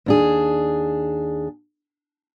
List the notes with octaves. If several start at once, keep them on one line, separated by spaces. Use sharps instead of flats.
D#2 D4 G#4